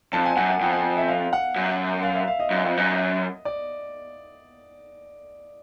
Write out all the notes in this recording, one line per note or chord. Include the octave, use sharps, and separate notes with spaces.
F2 A5
G#5
F#2 F#5
F#5
F2 G5
G#5
E5
F5
F#5
F#2
F5
E5
F5
D#5
F#2
F2
F#2
D5